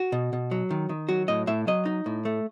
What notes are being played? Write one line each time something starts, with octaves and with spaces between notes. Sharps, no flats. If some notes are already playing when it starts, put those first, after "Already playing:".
Already playing: F#4
B2
B2
F#3
D#3
D#3
F#3 F#4
A2 D#5
A2 E5
F#3 D#5
D#4
A2
A3